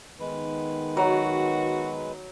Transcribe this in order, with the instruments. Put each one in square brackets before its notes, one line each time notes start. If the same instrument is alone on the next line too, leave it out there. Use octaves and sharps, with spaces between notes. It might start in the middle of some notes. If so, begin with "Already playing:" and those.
[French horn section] D#3 B3 [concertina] G#3 B4
[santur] F#3 [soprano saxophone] F#4